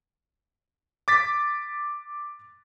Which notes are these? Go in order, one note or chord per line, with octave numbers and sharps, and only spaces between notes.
D6 A6 B6